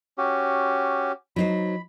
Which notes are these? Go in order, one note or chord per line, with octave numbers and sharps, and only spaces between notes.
C#4 F#4 G4
F#3 D#4 C5 B5